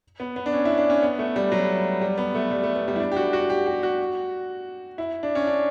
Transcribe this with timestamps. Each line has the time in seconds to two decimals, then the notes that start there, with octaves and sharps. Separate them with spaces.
0.20 B3
0.36 B3
0.46 D4
0.53 C#4
0.65 E4
0.78 D4
0.90 C#4
1.02 B3
1.19 A3
1.36 G3
1.52 F#3
2.01 G3
2.17 B3
2.35 A3
2.51 G3
2.63 A3
2.76 B3
2.88 G3
2.96 E4
3.00 D4
3.12 G4
3.16 F#4
3.33 F#4
3.50 G4
3.67 G4
3.83 F#4
4.98 E4
5.23 D4
5.35 C#4
5.47 D4